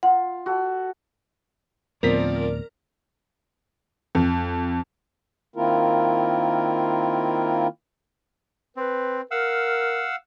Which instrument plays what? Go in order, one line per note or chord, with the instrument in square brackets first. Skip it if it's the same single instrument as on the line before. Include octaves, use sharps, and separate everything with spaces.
[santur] F4 [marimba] F#5
[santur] F#4 A4
[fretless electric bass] D2 A2 B3 [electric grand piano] F3 C4 B6 [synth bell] A#4 [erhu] D5
[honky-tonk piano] F2
[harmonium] D#3 A#3 C4 E4 F4 A#4
[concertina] C4 [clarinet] B4
[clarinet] A#4 [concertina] F5 F#5 E6